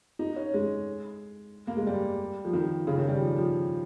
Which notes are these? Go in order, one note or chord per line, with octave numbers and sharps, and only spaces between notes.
D#4
C#4
G#3
A#3
G#3
G3
F3
D#3
C#3
D#3
G3
F3
F3